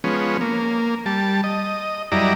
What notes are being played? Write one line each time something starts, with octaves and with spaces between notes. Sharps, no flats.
F3 G#3 B3 C#4
A#3
G3 A5
D#5
F#2 G3 E4 D5 D#5 A#5